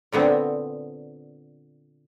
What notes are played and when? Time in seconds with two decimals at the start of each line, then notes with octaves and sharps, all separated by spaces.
0.12 A#2 D3 B3 C4